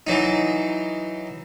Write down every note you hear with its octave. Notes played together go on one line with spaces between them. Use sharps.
E3 F#3 D#4